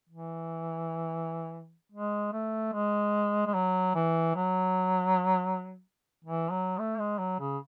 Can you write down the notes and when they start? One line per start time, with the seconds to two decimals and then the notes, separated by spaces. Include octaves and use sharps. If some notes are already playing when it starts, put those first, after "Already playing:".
0.09 E3
1.92 G#3
2.33 A3
2.73 G#3
3.47 G#3
3.54 F#3
3.95 E3
4.35 F#3
6.24 E3
6.51 F#3
6.79 A3
6.99 G#3
7.19 F#3
7.40 C#3